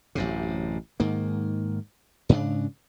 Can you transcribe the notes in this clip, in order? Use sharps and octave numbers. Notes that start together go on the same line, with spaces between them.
A1 F#2 C3
G#2 D#3 A#3
G#2 C#3 D4